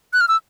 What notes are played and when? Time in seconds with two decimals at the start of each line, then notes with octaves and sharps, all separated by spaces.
0.13 F#6
0.20 F6
0.28 E6